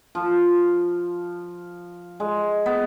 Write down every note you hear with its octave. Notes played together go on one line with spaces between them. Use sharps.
F3
G#3
B3